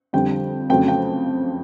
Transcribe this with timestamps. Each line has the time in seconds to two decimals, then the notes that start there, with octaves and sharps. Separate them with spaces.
0.13 F2 D3 G3 G5
0.70 F2 C#3 F#3 A3 G5
0.88 G5